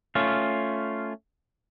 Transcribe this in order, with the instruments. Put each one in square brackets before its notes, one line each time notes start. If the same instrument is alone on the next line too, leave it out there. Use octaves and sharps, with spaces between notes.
[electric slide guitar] A3 C#4 F4